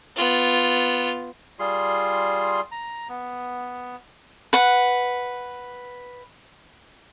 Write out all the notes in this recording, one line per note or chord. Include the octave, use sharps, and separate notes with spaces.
B3 F4
G3 F4 G#4 C6
A#5
B3
B4 F#5